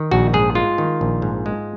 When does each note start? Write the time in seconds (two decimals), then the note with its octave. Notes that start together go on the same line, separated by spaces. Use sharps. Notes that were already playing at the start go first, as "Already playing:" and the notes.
Already playing: D#3
0.11 A#1 F#4
0.34 G#2 G#4
0.55 G#3 F4
0.78 D#3
1.01 A#1
1.22 G#2
1.46 G#3